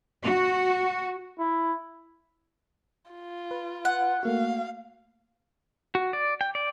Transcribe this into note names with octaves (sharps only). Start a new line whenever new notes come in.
F#4
E4
F4
B4
F#5
A3 A#3 F#4 F5
F#4
D5
G5
D5